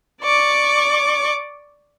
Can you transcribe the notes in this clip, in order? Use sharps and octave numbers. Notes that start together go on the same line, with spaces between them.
D5 C#6 D6